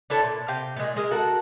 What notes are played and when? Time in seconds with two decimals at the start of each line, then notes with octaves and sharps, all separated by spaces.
0.10 D4 E4 A4 C#5
0.23 A#2
0.48 C3 F5 G5
0.76 A#2 G#3
0.96 G#3 G#4 A#4
1.11 F#4 A4 A#4 F#5